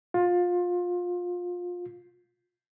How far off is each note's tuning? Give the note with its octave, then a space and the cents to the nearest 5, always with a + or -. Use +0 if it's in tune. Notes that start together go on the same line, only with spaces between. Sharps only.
F4 +25